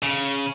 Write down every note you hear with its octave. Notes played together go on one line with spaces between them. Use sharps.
C#3